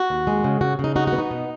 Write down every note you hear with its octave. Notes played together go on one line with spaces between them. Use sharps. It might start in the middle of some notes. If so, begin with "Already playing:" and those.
Already playing: F#4
D#2
G#3
C#3
C#3 F#4
C#3
D#4
D#4 F#4
F#4
B3
D#4
B2